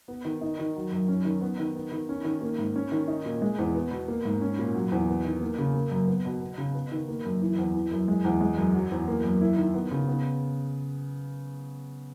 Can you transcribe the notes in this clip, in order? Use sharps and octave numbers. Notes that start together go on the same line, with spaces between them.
B3
D#3
D#4
D#3
F#3
F#2
C#4
D#3
B3
D#3
B3
D#3
C#4
D#3
A#3
G#2
C#4
D#3
D#4
A#2
G#3
E2
B3
B2
A#3
G#2
C#4
A#2
F#3
E2
B3
D#3
A#3
C#3
A#3
F#2
B3
B2
B3
C#3
B3
D#3
A#3
F#2
E3
E2
E3
F#2
G#3
E2
G#3
F#2
F#3
E2
A#3
F#2
E4
D#3
B3
C#3
B3